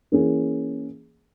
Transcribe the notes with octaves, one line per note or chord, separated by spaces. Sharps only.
E3 A#3 C#4 G#4